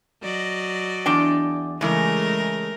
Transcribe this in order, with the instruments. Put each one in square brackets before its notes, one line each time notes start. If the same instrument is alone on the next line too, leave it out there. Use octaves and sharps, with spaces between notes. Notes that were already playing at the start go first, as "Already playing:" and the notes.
[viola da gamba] F#3 D5 D#5
[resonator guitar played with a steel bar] E2 D4 G5
[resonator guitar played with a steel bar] C#3 E3 [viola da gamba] G#3 A3 A#4